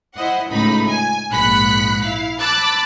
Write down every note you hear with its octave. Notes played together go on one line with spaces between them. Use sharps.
E4 C5 D#5 F#5
C#2 A2 D#4 B5
G#5
A#1 G#2 B5 F#6 B6 C#7
E4 F5
A5 B5 D6 E6 F#6 A6